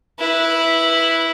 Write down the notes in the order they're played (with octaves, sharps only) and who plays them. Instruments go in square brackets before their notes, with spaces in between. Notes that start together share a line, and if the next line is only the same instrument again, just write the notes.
[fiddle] E4 B4